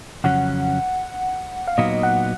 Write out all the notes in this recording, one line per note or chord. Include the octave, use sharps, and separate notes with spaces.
F2 C#3 F#3 C#4 F#5
F5
A#2 F#3 B3 D#4 D#5
F#5